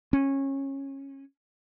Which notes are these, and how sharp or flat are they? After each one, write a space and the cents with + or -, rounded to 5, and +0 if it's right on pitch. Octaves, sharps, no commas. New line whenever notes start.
C#4 -20